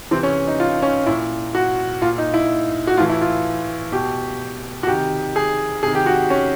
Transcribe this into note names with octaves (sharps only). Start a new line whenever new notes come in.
C3 E3 C4
C#4
D#4
F4
C#4
A#2 E4
F#4
A#2 F4
D#4
E4
F#4
A2 E3 F4
E4
F4
B2 G4
F#4
C3 D#3 G4
G#4
C3 D#3 G#4
G4
F#4
C#4